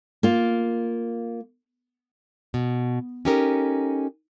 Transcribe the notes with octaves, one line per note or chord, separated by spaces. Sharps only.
A#3 F4
B2
C#4 D#4 G4 A4 A#4